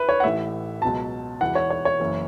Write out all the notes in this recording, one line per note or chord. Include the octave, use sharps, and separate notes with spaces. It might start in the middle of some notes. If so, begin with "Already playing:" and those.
Already playing: B4 E5
C#5
F#5
A1 A2 E3 E5
C#2 B2 F#3 A5
E1 E2 E3 F#5
C#5
C#5
C#5
F#1 F#2 E3